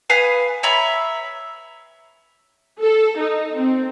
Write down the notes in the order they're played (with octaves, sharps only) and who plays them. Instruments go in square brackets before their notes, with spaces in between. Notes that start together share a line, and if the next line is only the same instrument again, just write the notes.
[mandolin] B4 F5 G#5 D#6
C#5 E5 A#5 B5
[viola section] A4
D#4
C4